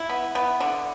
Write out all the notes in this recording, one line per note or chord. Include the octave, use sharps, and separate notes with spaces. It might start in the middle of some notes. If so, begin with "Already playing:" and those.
Already playing: E4
B3
B3
D3